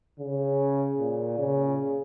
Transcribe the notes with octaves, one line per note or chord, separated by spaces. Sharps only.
C#3
A#2
C#3